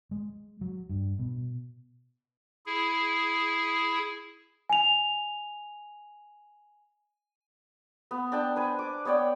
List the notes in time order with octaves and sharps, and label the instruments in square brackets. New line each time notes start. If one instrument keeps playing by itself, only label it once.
[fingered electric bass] G#3
F#3
G2
B2
[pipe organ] E4 G#4
[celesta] G#5 F7
[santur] B3
D4 G5 A5
B4 C5 G#5
D6
B3 C#5 D5 G5